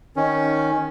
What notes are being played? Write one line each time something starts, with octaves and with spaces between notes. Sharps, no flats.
D#3 C#4